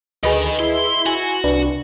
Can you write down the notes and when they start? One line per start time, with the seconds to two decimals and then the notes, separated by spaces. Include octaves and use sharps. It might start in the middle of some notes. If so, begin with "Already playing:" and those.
0.23 D2 D#3 G#4 B4 D#5
0.59 E4 C6
1.06 F#4 G#5
1.44 C2 D4 B4